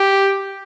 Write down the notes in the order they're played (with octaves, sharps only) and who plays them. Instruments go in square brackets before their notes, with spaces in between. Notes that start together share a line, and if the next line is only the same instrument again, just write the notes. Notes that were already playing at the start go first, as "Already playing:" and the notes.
Already playing: [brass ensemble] G4